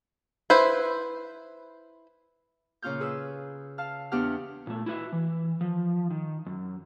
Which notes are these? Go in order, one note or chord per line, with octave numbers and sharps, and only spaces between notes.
E4 B4 C5
A#2 C#3 C#4 F4 F6 G6
G#4 B4 E6
F5 A5 F6
E2 B3 D4 G4 F#5 F6
A#2 A3
E4 F#4 B4 E5
E3
F3
D#3
F#2